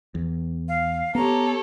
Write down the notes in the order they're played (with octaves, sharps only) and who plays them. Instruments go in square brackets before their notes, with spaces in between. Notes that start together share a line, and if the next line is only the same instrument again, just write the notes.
[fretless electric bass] E2
[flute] F5
[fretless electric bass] B3 [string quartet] G4 A4 C#5 [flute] A#5